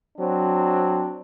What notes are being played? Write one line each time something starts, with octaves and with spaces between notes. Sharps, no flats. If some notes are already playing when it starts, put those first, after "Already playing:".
F#3 C4 D4